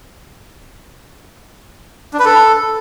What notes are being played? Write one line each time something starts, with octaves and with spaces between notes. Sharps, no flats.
D4
B4
A4